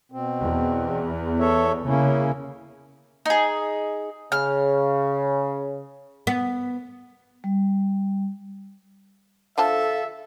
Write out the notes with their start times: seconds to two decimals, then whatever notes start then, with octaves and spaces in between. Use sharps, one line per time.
0.12 B2 C4
0.43 E2
1.39 A4 C#5 E5
1.87 C#3 A#3 C#4 E4
3.26 D#4 G#4
4.32 C#3 F6
6.27 B3
7.44 G3
9.58 D3 F3 A4 E5 F5 A5